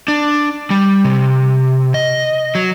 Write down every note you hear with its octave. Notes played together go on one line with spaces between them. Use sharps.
D4
G3
C3
D#5
F#3